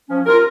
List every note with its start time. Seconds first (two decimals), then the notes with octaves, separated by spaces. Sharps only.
0.08 F3 C#4
0.25 D#2 F4 A#4